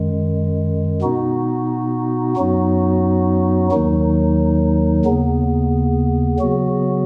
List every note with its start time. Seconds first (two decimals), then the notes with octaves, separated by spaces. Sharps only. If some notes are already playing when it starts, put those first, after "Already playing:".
Already playing: F#2 D#3 G#3
1.02 B2 B3 D#4 F#4
2.36 F#2 F#3 B3 D#4 F#4
3.71 D#2 D#3 F#3 D#4
5.05 D#2 C#3 B3
6.39 C#3 F#3 B3 F#4